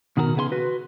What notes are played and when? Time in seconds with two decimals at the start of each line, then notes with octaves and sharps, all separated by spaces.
0.17 B2 D#3 F#4 G#4 A#4
0.36 C#3 B3 G#4 F5 C6
0.52 F#4 B4